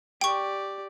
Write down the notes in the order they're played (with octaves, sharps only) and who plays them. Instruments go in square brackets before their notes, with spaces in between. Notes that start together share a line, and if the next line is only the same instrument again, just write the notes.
[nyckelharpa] G4 D5 [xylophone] G5 C#6